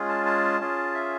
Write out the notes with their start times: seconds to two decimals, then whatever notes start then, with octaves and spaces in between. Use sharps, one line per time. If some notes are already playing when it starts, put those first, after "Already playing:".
Already playing: G#3 C#4 F4 G#4
0.09 A5
0.26 A5
0.60 C#4 F4 G#4
0.94 E5